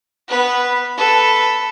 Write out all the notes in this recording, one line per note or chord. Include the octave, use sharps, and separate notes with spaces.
B3 B4
A4 B4